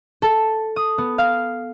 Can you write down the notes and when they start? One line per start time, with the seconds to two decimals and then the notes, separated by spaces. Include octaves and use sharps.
0.22 A4
0.76 D#6
0.98 B3
1.18 F5